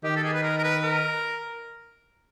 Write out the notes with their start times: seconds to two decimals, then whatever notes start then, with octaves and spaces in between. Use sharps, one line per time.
0.04 D#3 G4
0.16 A4
0.24 G#4
0.34 B4
0.43 A#4
0.58 A#4
0.64 B4
0.83 A#4